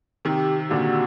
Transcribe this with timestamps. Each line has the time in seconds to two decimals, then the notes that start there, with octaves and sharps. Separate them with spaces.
0.25 C3 D#3 G4
0.71 A#2 D3 F#4